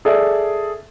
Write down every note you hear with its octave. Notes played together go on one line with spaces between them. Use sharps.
G#4 A4 D5 E5